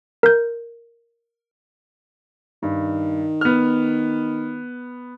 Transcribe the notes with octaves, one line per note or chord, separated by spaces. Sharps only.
A#4 G6
G2 D#3
B3 F6